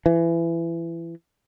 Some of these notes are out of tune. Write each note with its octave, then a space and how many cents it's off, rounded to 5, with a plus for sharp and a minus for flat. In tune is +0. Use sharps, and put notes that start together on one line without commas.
E3 +25